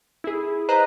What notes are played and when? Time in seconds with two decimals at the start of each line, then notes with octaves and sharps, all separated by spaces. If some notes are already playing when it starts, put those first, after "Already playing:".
0.24 E4 G#4
0.69 B4 C5 D#5 A#5 F#6